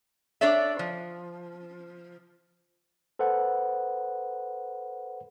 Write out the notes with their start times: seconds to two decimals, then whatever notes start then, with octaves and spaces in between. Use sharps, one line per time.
0.41 D4 A4 C#5 D5 E5
0.79 F3
3.19 A4 B4 C5 F#5